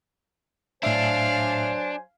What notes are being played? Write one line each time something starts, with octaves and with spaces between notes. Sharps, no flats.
A2 F#3 D4 C5 E5 F5 G#5